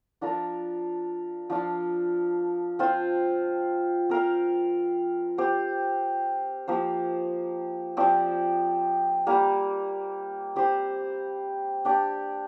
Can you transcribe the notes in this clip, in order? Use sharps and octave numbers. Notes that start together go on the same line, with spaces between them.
F3 D4 F4 A#4
F3 D4 F4
C4 F4 C5
C4 A#4 F5
C4 G4 C5
F3 A#3 G4 C5
F3 C4 G4 D5
G3 A#3 G4
C4 G4 C5
D4 G4 D5